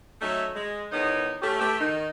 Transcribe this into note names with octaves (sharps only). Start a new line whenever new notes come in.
F#3 A3 C#4 D#4 C#5 E5
G#3
E2 D#3 B3 D#4 C#5 D#5
A3 C#4 G4
A3 G4 B4
D#3 D#4